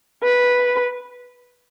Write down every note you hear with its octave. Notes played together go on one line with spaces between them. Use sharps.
B4